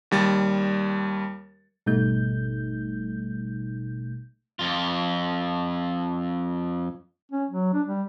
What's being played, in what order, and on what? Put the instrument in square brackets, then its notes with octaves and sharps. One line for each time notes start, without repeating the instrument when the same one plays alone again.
[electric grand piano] D#2 G3 A6
[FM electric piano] G#1 B2 G3 A3 D#4 G6
[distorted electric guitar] F2 F4
[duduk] C#4
F#3
D4
G3